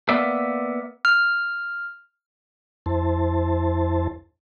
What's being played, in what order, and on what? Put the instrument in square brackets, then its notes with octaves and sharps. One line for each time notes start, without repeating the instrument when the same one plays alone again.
[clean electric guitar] A#3 B3 D5 E5
[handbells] F6
[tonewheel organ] F2 E4 C5 A5